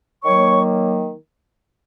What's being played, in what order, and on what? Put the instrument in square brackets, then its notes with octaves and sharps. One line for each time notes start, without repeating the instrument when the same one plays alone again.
[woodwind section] D#3 F#3 A#3 C#5 C#6